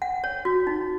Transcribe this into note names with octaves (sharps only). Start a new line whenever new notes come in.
F#5
C#5
F#4
D#4